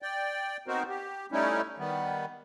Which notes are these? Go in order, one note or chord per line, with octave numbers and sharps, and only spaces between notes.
D5 G5
B3 C4 D#4 F#4 A#4 C5
G4
G3 A3 C#4 D#4 E4
D#3 G3 B3